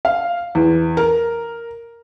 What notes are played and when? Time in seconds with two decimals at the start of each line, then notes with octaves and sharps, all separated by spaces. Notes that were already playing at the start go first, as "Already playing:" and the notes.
0.05 F5
0.55 E2
0.97 A#4